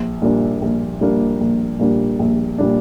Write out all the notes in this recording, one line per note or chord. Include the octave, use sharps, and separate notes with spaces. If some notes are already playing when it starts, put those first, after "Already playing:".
Already playing: A#1
A#2 G3 A#3 D4
A#1
A#2 G3 A#3 D4
A#1
A#2 G3 A#3 D4
A#1
A#2 G3 A#3 D4